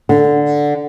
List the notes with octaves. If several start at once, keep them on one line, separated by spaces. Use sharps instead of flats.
D3